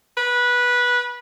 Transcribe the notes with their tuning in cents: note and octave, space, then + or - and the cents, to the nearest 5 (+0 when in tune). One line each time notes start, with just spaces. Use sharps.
B4 -15